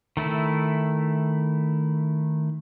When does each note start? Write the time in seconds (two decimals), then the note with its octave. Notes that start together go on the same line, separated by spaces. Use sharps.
0.17 D#3 A3 E4